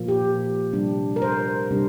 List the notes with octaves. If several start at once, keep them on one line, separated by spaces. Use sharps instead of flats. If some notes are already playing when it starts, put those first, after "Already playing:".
Already playing: A#2 F3 A#3
G4
C3 G3 D4
A#4
C5
C3 G3 D4